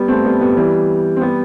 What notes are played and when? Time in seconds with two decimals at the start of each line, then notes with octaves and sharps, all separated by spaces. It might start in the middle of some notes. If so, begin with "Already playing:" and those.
Already playing: G3 B3
0.08 A3 C4
0.24 G3 B3
0.41 G3 B3
0.57 E3 G3
1.16 C4
1.21 G3 B3